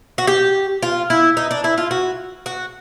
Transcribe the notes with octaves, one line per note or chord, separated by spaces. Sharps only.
F#4
G4
F4
E4
D#4
D4
E4
F4
F#4
F#4